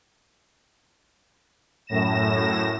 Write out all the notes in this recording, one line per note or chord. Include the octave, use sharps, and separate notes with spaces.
F#2 A2 A#6 E7